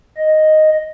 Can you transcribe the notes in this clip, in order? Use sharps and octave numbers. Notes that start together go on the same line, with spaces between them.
D#5